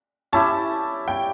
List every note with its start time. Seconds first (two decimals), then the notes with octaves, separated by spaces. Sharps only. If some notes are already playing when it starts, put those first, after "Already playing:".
0.33 C#4 E4 G4 A5
1.08 G5